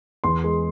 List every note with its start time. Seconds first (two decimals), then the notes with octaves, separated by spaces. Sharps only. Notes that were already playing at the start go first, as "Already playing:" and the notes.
0.24 E2 C6
0.44 G#3